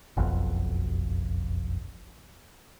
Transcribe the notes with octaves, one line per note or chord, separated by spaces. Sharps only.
F#1 B1 F2